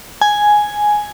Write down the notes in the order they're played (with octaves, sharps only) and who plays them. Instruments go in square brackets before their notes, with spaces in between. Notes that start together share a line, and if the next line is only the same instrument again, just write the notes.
[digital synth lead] G#5